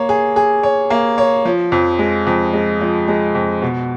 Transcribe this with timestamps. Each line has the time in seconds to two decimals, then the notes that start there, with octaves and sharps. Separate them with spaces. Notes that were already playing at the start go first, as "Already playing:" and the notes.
Already playing: A#3 C#5
0.09 G#4
0.36 G#4
0.63 C#5
0.90 A#3
1.18 C#5
1.45 F3
1.72 F2
1.99 G#3
2.26 F2
2.53 G#3
2.81 F3
3.08 G#3
3.35 F2
3.62 B2